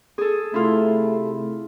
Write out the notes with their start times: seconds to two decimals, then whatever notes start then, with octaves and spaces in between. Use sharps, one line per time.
0.18 G#4 A4
0.54 C3 A3 E4 F4